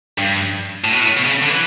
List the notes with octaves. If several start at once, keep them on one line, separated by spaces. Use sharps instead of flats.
G2
A2
B2
A2
B2
C#3
D3
E3